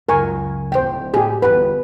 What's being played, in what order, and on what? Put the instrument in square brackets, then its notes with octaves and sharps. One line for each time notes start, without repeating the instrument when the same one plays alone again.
[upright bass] C#2 F#2 [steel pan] A#4 G#5 C#6
[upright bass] D1 D#4 [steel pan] C5 G5
[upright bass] A2 [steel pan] G4 G#4
[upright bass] G1 E2 [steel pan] B4